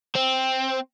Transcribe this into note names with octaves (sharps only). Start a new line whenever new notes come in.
C4